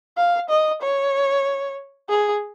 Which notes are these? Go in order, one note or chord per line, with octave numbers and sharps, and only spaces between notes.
F5
D#5
C#5
G#4